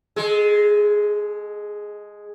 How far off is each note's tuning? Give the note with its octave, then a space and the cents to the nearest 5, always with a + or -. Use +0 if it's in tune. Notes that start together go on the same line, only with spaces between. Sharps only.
G#3 +0 A4 -35